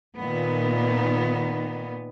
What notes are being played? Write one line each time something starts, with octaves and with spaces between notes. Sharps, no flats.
A#2 D#3 B3